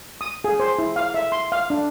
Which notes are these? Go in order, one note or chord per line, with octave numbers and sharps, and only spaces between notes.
D#6
G#4
C5
E4
F5
E5
C6
F5
D4